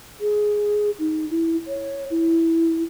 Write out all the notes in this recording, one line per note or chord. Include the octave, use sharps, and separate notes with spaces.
G#4
D#4
E4
C#5
E4